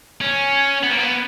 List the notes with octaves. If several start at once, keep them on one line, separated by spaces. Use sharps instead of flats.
C#4
B3
A#3
B3